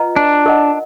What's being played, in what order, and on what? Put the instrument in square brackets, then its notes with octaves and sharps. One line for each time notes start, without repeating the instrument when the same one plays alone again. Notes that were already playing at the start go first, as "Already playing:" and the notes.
Already playing: [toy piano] F4 B4 D#5 F#5 A#5
[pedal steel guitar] D4
[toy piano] A#4 D#5 F#5